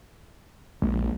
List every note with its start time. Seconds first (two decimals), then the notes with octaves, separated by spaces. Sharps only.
0.82 D#1 A#1 G#3 A#3